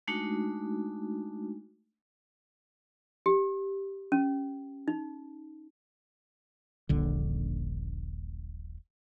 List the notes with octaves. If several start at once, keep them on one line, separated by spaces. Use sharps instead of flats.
G#3 A3 D4 D#4 F#4
G4
C#4
D#4
D#1 A#1 D3